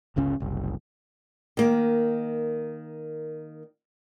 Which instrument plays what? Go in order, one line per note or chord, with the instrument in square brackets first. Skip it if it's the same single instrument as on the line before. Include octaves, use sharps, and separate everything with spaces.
[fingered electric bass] G1 C#2 C#3 C#4
F#1 C2
[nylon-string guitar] D#3 A#3